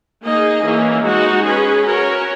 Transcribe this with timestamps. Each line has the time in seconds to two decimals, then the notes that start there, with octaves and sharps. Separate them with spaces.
0.23 A#3 D#4 G#4 D#5
0.63 E3 A#3 C#4
1.04 G#3 D#4 F#4
1.44 C#4 G#4 B4
1.84 C#4 F#4 A#4 C#5